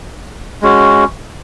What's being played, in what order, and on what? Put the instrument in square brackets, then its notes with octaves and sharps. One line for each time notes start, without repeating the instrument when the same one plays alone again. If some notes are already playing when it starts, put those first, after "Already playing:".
[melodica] G#3 C#4 F#4